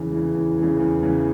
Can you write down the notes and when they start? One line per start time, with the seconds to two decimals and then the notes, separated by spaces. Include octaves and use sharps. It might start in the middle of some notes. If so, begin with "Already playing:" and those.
Already playing: E2 C#3 E3
0.12 C#3 E3
0.35 E2
0.58 C#3 E3
0.79 E2
1.03 C#3 E3